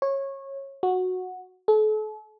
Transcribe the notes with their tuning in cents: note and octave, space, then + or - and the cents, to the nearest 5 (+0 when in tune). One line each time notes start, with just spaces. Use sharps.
C#5 -20
F#4 -10
A4 -40